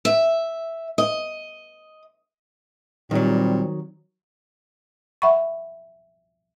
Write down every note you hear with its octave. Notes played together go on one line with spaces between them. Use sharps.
E5
D#5
A#2 D#3 F#3 G3 C4
E5 F#5 B5 C#6